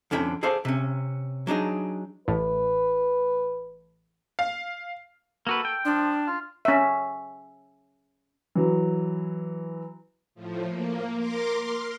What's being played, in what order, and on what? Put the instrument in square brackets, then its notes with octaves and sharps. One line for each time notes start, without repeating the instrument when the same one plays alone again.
[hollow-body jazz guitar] F2 D3 C#4 E4 G5
G#4 A4 C5 D5 F5
C3 C#4
F#3 D4 D#4 G#4
[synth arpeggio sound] A1 A2 [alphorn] B4
[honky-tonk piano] F5
[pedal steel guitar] A#3 F#4 B4 [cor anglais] A4
[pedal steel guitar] G5
[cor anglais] F3 [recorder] D4
[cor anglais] F4
[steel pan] C#4 E5
[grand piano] E3 F#3
[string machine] A2 F3
A#3
A#4 C6 D6 A#6
C6 F6